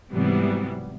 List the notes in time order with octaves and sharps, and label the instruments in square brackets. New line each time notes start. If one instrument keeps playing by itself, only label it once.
[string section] G#2 C3 E3 F#3 G3 B3